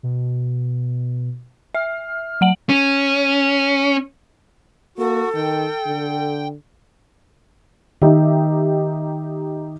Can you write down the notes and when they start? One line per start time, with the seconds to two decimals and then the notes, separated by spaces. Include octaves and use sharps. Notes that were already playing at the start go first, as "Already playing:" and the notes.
0.03 B2
1.75 E5 F6
2.41 F#3 F#5 F#7
2.69 C#4
4.98 A#3 F#4 A4
5.35 D#3 G5
5.87 D3
8.02 D#3 D#4 G4 E5